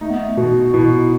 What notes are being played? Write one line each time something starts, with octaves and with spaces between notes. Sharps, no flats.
A3 D#4
B3
A3
B2 F#4
B2 E4